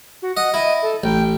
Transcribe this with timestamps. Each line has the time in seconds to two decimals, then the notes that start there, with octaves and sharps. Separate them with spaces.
0.22 F#4
0.37 D#5 F#5
0.54 E4 D#5
0.82 A4
1.04 A1 G5